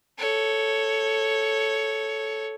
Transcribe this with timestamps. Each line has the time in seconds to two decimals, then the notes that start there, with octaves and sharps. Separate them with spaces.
0.18 A4 C#5